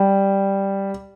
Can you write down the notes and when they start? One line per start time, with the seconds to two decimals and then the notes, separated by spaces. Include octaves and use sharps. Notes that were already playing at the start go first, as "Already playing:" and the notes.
Already playing: G3